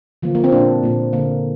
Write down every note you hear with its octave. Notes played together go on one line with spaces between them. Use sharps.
D3 F3 A#3
A#3
C4
A#2 A#3 D4
A#2 A#3
D3 A#3